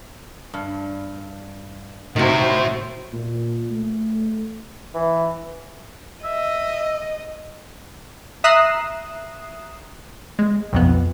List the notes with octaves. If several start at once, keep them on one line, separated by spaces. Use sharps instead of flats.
G2
A2 C3 D#3 E4 F#4 C5
A#2
A3
E3
D#5 E5
E5 A#5 D#6 F#6 C7 E7
G#3
B1 F2 B3